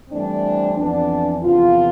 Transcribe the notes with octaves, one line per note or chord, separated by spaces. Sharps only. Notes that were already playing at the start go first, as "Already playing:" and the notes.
G2 E3 A3 C4 D4
F2 E3 B3 D4
E2 C3 F3 B3 F4